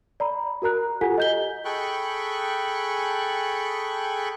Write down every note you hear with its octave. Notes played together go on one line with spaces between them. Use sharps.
D5 A#5 B5
F#4 A#4 A#5 F#6
F4 G4 A4 F#5 G#5 B6
D#5 G6 G7
G#4 A4 G5 B5 C#6 F#6